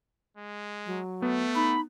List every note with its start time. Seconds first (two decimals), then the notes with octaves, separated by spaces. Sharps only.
0.37 G#3
0.86 F#3
1.22 A3 B3
1.55 D#4 B5